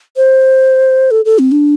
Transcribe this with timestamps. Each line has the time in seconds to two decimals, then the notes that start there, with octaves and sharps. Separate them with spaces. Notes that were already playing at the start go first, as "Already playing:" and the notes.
0.16 C5
1.11 A4
1.25 A4
1.39 C4
1.52 D4